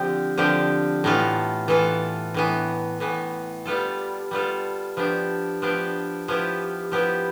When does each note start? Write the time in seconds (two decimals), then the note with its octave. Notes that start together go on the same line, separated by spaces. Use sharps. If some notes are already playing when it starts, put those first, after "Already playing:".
Already playing: D3 F3 C4 G4
0.38 D3 F3 C4 G4
1.04 A2 E3 B3 F4 A4
1.68 A2 E3 B3 F4 A4
2.34 A2 E3 B3
3.00 A2 E3 B3
3.65 G3 B3 F4 A4
4.31 G3 B3 F4 A4
4.97 F3 B3 D4 G4
5.62 F3 B3 D4 G4
6.28 F3 B3 E4 G4
6.92 F3 B3 E4 G4